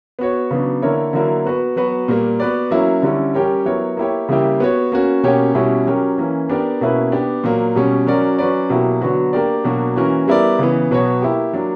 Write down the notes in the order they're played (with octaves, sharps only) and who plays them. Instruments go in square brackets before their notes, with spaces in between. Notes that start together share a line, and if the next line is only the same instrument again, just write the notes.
[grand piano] B3 F#4 C#5
C#3 F#3 B3 D4
D3 A#3 E4 A#4 C#5
D3 F#3 A#3 E4 A#4
B3 F#4 B4
F#3 B3 F#4 B4
A#2 G3 A#3
B3 F#4 B4 D5
F#3 A#3 C#4 E4
D3 G3 C#4 E4
G3 C#4 G4 A#4 C#5
F#3 B3 E4 A#4 C#5
A#3 E4 G4 C#5
C#3 G3 A#3 E4 G4
B3 F#4 C#5
A#3 C#4 F#4
B2 A#3 C#4 G4 C#5
B2 G3 C#4 E4
F#3 C#4 G4 A#4
E3 A#3 C#4
B3 D4 G4 A#4 D5
B2 A#3 C#4 E4 B4
B3 D4 G4
A#2 F#3 A#3
B2 G3 C#4
F#3 C#4 F#4 A#4 D5
F#3 C#4 F#4 B4 D5
B2 F#3 A#3 E4 G4
D3 F#3 B3 F#4
A#3 D4 G4 A#4 D5
B2 F#3 A#3 D4 F#4
E3 A#3 C#4 F#4 A#4
G3 B3 E4 A#4 D5
C#3 E3 B3
B2 F#3 B3 F#4 C#5
A#3 E4 G4
F#3 A#3 D4